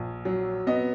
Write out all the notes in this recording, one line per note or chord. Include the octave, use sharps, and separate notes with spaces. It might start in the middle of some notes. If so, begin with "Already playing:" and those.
Already playing: A#1
F#3
B3 D#5